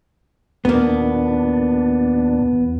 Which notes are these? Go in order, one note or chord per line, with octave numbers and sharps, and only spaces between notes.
D#2 A#2 A#3 B3 D4
E2